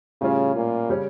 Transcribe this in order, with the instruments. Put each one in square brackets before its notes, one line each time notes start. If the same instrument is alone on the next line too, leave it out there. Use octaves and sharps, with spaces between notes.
[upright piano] A2 G3 C#4 F4 [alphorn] C#3
[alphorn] A#2
[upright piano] C#3 G3 C#4